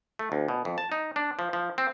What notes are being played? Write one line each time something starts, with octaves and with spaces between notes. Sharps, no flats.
A3
D2
B2
F2
A5
D#4
D4
F3
F3
C4